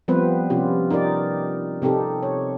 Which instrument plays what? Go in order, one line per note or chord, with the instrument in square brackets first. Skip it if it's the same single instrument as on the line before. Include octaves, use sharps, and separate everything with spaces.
[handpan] F3 G3 B3 C4 B4 C5
C3 F3 C#4 F4 G4
D#4 G4 A#4 D5
C3 C4 D#4 G4 A4
C#5